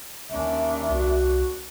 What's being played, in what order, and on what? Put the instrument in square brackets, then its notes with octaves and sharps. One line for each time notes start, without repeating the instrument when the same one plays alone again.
[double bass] D#2 D4 [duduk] C#4 [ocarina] E5
[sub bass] C2 [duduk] F#4